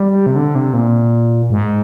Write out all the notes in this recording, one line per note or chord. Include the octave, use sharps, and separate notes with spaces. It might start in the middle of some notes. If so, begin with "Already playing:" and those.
Already playing: G3
C3
D3
C3
A#2
G#2